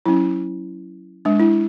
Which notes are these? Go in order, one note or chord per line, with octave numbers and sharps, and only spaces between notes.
F#3 C#4 E4
G#3 D4
E4